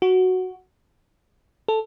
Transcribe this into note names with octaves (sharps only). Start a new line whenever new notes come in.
F#4
A4